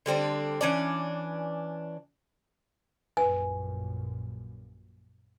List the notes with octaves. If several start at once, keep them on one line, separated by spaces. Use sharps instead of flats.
D3 G3 C4 D4
E3 C#4 D4 D5
A#1 F#2 A#2 B4 G#5